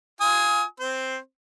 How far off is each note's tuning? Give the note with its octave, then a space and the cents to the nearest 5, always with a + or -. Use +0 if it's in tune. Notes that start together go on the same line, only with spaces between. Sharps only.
F4 +0 G#5 +0 D#6 +30
C4 +0 C5 +0